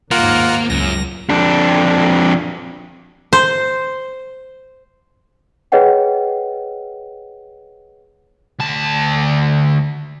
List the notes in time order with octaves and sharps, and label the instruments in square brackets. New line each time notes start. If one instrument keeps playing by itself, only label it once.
[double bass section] D#2 G#2 [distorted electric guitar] A#3 [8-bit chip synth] F4 A#4 F#5
[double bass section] C#2 [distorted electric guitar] F#2 [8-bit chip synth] A#6
[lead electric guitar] F2 D4
[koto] C5
[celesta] G#4 B4 C#5 D#5 F#5 G5
[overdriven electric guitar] D2 A5